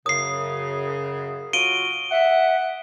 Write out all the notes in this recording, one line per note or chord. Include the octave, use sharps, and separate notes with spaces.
F#2 C#3 D#6 C7
F#3 F4 F#4 D7 D#7 G7
E5 F#5